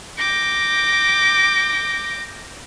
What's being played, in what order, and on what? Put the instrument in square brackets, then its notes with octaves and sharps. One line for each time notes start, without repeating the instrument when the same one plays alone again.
[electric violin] G5 D6 [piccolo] A#6